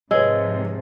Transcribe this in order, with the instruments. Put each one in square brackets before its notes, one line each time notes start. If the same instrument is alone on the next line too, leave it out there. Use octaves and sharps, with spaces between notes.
[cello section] G#2 C3 F3 [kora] G#3 [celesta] B4 C#5 E6 [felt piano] D#5